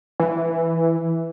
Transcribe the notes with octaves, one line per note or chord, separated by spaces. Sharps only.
E3